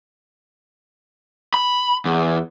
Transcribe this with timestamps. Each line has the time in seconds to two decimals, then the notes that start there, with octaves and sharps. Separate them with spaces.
1.54 B5
2.05 E2